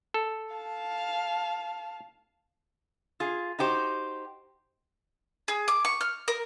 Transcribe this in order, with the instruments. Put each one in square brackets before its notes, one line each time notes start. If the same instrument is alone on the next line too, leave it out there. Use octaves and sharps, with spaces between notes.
[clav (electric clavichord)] A4
[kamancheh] F5 A5
[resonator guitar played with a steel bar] F4 G#4
D#4 F#4 G4 C5
[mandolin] G#4
D6
C#6
F6
A#4